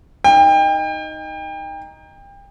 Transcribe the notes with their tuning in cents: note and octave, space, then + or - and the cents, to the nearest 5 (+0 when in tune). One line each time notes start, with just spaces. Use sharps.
D#4 +0 G5 +30